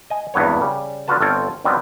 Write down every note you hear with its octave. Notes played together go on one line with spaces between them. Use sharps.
D#5 G#5
G#1 E2 G2 B3 C#5
C#3 G3
D3 B3 F4 F#4 B4 A5
G1 C4 F4 A4 C#5 G5
G2 D#3 F#3 G3 B3 C4